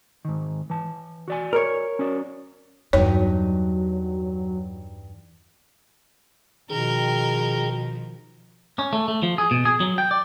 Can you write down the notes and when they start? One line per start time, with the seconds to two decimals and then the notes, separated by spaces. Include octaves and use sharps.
0.25 G#2 D#3
0.70 E3 A5
1.28 F#4 D5 G#5
1.53 A#4 C#5
1.99 C#4 F#4 D5
2.93 E2 G2 F#3 D#4 C#5
6.70 B2 D#3 F3 G#4 A#4 G5
8.79 C#4
8.93 A3
9.08 A3
9.23 F3
9.38 G#4
9.51 B2
9.65 G#4
9.80 F#3
9.98 G5
10.11 D5